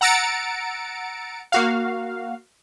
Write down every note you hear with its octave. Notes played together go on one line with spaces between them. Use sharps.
F#5 A#5 E6 A6 C#7 D7
A#3 F#4 F5